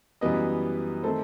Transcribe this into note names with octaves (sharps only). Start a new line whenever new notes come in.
F#2 E3 G3 B3 B4 D#5
D#3 A3 C4 A4 C5